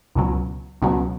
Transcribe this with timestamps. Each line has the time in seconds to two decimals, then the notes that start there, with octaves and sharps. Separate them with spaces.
0.15 C#2 B2 F#3
0.82 C#2 B2 F#3